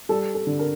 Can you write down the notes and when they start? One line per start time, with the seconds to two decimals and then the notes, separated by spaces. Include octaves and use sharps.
0.09 G3 A4
0.34 A4
0.47 D3
0.59 A#4